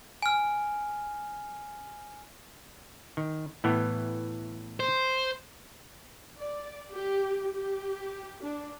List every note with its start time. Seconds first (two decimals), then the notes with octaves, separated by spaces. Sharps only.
0.22 G#5 F6
3.17 D#3
3.64 A2 E3 B3
4.80 C5
6.38 D5
6.92 G4
7.56 G4
8.43 D4